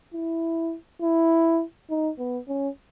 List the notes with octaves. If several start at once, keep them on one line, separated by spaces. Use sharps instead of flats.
E4
E4
D#4
B3
C#4